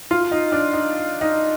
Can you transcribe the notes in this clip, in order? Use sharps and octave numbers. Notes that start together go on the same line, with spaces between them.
F4
D#4
D4
D#4
D#4